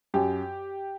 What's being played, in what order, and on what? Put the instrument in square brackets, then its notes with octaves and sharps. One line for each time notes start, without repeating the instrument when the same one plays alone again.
[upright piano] F#2 G4